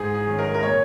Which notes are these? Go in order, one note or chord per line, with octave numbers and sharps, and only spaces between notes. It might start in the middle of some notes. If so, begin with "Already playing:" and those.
Already playing: G#2 G#4
G#4
D#3 F#3 C#4
A#4
A#4
A#2 C#5